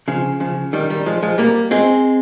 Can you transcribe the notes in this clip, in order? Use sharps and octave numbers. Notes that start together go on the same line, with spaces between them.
C#3 F3
C#3 F3
D#3 G3
D#3 G3
F3 G#3
F3 G#3
G3 A#3
G#3 C4